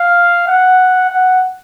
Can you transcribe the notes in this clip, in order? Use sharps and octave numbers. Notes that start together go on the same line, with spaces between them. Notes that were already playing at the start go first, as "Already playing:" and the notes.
Already playing: F5
F#5
F#5